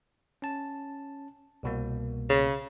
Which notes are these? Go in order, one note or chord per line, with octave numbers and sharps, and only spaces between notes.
C#4 A5
C2 B2 A#3
C#3